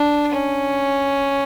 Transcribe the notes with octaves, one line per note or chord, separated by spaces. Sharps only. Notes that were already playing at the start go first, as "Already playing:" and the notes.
Already playing: D4
C#4